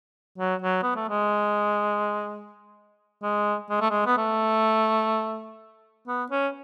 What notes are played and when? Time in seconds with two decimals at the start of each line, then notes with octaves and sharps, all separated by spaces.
0.38 F#3
0.62 F#3
0.83 B3
0.96 A3
1.09 G#3
3.23 G#3
3.70 G#3
3.81 A3
3.91 G#3
4.06 B3
4.18 A3
6.07 B3
6.31 C#4